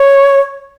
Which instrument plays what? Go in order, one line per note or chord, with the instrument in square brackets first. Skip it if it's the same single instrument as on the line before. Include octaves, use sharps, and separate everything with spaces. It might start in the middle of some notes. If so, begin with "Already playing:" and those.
Already playing: [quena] C#5